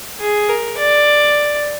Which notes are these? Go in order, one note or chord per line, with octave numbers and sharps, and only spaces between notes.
G#4
A#4
D5